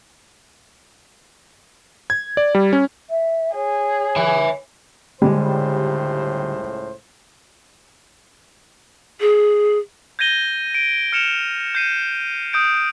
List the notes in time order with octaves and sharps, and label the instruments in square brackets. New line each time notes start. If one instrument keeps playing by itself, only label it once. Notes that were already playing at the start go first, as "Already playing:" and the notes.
[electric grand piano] G#6
D5
G3
C#4
[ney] E5
[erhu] G#4 [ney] C#5
[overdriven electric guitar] E5 G#5
[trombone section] C#2 A2 C5 [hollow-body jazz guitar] D3 G#3 [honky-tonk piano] G3
[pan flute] G#4
[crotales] G6 G#6 A#6 D#7 G7
D7
F6 C#7 E7 F7
G6 C7 D#7
D#6 G6 D7